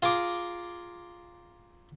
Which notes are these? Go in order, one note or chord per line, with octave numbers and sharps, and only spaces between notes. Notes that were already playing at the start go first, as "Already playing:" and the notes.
F4 G#4 A#5 D6